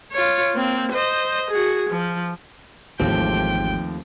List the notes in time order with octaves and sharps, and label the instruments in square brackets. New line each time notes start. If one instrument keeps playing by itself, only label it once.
[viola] F4 C#5
A#3 C4
C5 D#5
F#4 G#4
F3
[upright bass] G#1 E3 [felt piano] D#2 F3 [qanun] A3 C4 G4 [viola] G5